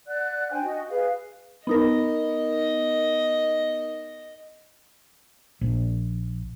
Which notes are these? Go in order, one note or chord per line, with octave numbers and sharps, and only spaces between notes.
D5 F#5 F#6
D4 C5 G5 G#5
F#4 D#5
G#4 B4 F5
B3 D#4 A#4 D#5
A#1